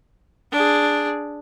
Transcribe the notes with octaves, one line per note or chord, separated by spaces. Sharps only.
D4 G#4